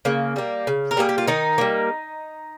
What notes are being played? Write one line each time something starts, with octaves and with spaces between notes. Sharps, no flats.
C#3 A#3
G3 A#3
C#3
A#4
G3 A#3 G#4
G4
F4
D#3 D#4
G3 A#3